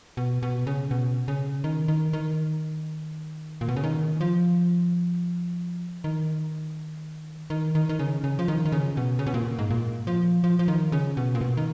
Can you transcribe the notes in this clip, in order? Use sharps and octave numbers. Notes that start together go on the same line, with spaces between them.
B2
B2
C#3
B2
C#3
D#3
D#3
D#3
A#2
B2
C#3
D#3
F3
D#3
D#3
D#3
D#3
C#3
C#3
F3
D#3
D#3
C#3
B2
C#3
B2
A#2
G#2
A#2
F3
F3
F3
D#3
C#3
B2
A#2
B2
D#3